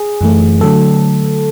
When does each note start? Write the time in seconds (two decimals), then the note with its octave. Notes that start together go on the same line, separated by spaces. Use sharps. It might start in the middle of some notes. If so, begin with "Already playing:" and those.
Already playing: G#4
0.21 F#2 E3 A3
0.61 D3 F#3 A3 A4